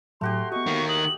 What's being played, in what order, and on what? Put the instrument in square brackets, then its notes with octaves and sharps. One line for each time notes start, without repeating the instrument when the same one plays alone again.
[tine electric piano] A2 F#3 [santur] A3 F#4 G4 [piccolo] C6
[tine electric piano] B3 F#4 [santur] D#5 [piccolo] C#6
[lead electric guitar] D#3 A#3
[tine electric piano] D#6 [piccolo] F#7